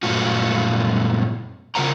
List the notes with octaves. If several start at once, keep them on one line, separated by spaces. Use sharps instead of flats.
F#2 A#2 A3 F4 F#4
C#3 F4 A#4 F#5 G5 A#5